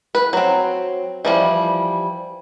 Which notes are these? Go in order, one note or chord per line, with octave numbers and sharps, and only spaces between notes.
B4
F#3 C4
E3 F3 G3